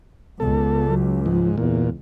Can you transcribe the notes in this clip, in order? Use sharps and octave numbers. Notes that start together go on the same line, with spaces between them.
C#2 B3 A4
F#3
G#2 F3
E2 A#2